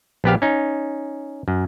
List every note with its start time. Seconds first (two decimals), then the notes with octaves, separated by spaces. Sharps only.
0.24 A#1 B3 G4 F5
0.42 C#4 D#4
1.48 F#2